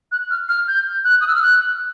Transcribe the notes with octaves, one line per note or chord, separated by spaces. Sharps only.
F#6
F6
F6
G6
F#6
D#6
E6
F6
F#6